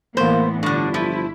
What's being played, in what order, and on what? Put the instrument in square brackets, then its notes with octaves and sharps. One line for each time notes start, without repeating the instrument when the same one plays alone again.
[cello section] A2 E3 B3 [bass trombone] A#3 [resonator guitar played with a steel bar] C5
[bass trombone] G1 [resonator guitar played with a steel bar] A2 D3 [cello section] D4
[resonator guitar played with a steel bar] F3 [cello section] E4